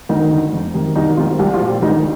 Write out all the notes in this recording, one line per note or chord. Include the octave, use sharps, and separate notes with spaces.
D2 D#3 D#4
D3
F2
C3 D#3
C2 D#3 D#4
C3 D#3 F3 F4
C2 G3 G4
F3 F4
A#2
G3 G4
D2 D#3 D#4